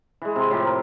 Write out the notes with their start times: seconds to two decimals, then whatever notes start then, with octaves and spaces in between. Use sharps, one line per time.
0.22 E3 G#3
0.36 C3 C6
0.50 A2 F3 G4 A4
0.65 A#4